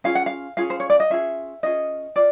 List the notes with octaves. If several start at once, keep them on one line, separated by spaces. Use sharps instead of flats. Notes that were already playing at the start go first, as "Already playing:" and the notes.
C#4 F4 G#4 F5
F#5
F5
C#4 F4 G#4 F5
C5
C#5
D5
D#5
C#4 F4 G#4 E5
C#4 F4 G#4 D#5
F4 D5